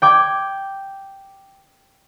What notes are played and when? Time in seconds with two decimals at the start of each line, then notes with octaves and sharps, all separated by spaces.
0.02 G5 D6 G#6